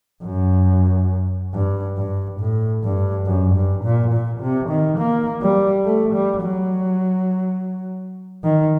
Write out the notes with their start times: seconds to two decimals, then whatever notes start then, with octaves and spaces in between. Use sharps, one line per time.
0.24 F#2
1.53 G2
1.97 G2
2.39 A2
2.84 G2
3.26 F#2
3.55 G2
3.84 A#2
4.12 A#2
4.41 C3
4.70 D#3
4.99 A#3
5.42 G3
5.85 A3
6.14 G3
6.42 F#3
8.44 D#3